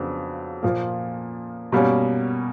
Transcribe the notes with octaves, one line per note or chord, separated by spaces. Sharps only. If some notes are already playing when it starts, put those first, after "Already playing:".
Already playing: F2 C#3 F#3 B3 D4
A#2 F3 A#3
B2 G3 A#3 C#4